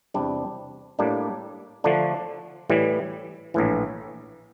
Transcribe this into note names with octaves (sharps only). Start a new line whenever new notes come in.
E2 C3 G3 D4
A2 G3 A#3 D4
D3 F3 A3 D4
A2 E3 G3
A#1 A2 E3